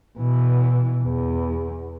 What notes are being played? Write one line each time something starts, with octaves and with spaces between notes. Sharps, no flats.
B2 E3
E2